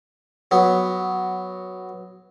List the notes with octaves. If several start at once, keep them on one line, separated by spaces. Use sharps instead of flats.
F#3 B3